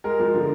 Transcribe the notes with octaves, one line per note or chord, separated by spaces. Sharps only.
G#3 A#4
F3
D3